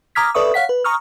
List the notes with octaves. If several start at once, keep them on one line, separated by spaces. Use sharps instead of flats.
A#5 D6 D#6 F6 G#6 B6
A4 B4 D5 E5 C#6 D#6
C#5 F5 F#5 B6
B4
A#5 C#6 D#6 F6